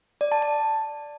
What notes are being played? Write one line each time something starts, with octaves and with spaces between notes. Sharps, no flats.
D5
A5
A5